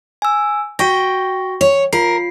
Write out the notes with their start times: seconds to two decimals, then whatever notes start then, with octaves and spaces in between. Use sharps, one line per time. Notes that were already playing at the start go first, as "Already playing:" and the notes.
0.22 G#5 E6
0.79 F#4 G5 C#6 A#6
1.61 C#5
1.93 F4 A#4 C7